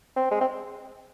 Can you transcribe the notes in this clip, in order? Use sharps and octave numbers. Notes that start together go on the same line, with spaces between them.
C4
G#3
C4